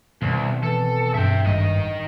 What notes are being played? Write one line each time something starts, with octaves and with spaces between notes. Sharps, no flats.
C2 B2 D#3 C4
E3 A4
G2 E5 G5
G#1 D#3 G3 D#5